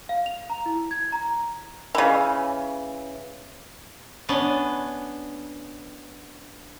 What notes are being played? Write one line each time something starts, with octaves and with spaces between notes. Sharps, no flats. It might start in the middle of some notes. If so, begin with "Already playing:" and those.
F5
F7
A#5
E4
G#6
A#5
C#3 E3
B3 C#4 D4